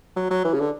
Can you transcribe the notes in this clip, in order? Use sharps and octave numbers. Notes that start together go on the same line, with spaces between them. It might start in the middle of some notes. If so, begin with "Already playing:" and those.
F#3
F#3
E3
C#3
D3